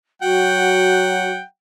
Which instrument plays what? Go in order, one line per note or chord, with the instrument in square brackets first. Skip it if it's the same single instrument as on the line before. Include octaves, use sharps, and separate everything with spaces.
[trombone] F#3 [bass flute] F#4 [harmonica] F#5 G5